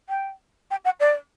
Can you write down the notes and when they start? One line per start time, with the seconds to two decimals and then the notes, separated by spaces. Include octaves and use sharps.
0.09 G5
0.70 G5
0.84 F#5
0.99 D5